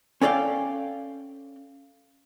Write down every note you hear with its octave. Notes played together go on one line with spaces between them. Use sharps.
C#4 A4 D5 F5 G5